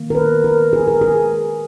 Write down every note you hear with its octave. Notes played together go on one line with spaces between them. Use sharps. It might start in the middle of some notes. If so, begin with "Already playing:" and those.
Already playing: D#3 A#3
A#4
B4
A#4
G#4
A#4
G#4